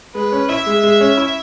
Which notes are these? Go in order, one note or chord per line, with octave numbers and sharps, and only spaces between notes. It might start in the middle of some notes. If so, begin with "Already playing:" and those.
G#3 B4
C#4
E4 E5
G#3
G#3
C#4
E4